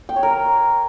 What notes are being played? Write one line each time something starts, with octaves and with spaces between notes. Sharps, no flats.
G5
C#5
A#4